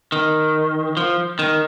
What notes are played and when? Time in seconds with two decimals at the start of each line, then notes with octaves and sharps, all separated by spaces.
0.12 D#3
0.97 F3
1.39 D#3